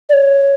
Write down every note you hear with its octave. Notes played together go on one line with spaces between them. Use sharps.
D5
C#5